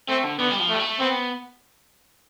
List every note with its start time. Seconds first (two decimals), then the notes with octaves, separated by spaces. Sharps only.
0.09 A3 C4
0.24 D3
0.38 D3 B3
0.51 G3
0.59 F3
0.69 A3
0.73 G3
0.80 A3
1.00 B3 C4